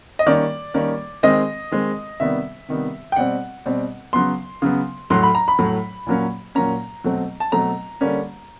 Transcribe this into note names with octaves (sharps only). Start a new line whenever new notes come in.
D#5
D#3 G3 A#3 C#4 D5
D#3 G3 A#3 C#4
D#3 G#3 C4 D#5
D#3 G#3 C4
C3 D#3 G3 B3 E5
C3 D#3 G3 B3
G5
B2 G3 C4 F#5
B2 G3 C4
C#3 F#3 B3 C6
C#3 F#3 B3
A2 F#3 A3 C6
B5
A#5
B5
A2 F#3 A3
A#2 F#3 A#3 C#4
A#2 F#3 A#3 C#4 A#5
B2 F#3 A3 C4
A5
B2 F#3 A3 C4 A#5
D3 G3 A#3 C#4